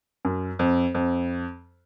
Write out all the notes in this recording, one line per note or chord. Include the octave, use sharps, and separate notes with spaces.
F#2
F2
F2